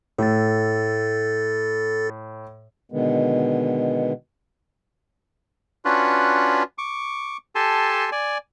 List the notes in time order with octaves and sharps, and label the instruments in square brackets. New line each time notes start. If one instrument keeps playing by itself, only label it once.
[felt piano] A2 [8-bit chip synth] A4 A6
[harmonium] B2 D3 D#3 G#3 B3
[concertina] C#4 D4 F4 F#4 B4
C#6 D6
G4 A4 G#5 A5 C6
D5 G#5